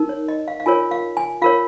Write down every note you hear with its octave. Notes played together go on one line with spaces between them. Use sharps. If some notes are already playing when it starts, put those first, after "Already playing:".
Already playing: D#4 A#4
C#5
D#5
F5
F5
F4 A#4 C#5 G#5
F5
G#5
F4 A#4 C#5 F5